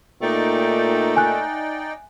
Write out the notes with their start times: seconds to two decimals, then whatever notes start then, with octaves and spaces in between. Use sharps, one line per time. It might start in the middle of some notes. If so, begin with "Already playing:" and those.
0.22 A#2 A3 D#4 D5 G5
1.15 E5 G#5 F#6